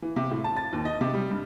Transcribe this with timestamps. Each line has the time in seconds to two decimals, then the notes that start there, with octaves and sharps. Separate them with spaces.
0.02 E3
0.16 C3
0.31 A2
0.44 A5
0.57 A6
0.73 D#2
0.85 D#5
1.01 C3
1.14 G3
1.30 G2